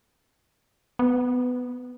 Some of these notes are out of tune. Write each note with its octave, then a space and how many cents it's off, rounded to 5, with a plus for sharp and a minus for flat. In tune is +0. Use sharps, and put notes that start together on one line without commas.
B3 +15